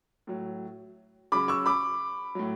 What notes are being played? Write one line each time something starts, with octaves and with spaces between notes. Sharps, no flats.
A2 F#3
C#3 F#3 B5 D6
C#6 E6
B5 D6
A2 F#3